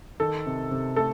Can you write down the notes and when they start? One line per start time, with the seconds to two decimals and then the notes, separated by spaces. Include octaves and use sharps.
0.20 D#3 A4
0.46 C3
0.71 C3
0.96 A3 A4